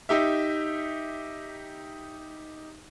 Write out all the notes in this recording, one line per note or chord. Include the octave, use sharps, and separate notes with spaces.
D#4 G4 E5